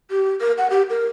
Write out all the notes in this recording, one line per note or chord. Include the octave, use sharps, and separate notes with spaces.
G4
A#4
F#5
G4
A#4